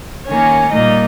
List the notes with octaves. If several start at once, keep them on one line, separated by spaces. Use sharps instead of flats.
D#3 A#3 C#4 C#5
A#2 G3 A#3 D#4 D#5